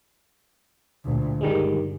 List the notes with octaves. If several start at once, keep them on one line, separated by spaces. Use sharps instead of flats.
D2 A#2
G1 D#3 G3 G#3